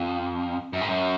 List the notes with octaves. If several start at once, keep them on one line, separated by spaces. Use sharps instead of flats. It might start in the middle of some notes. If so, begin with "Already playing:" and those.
Already playing: F2
F#2
G#2
F#2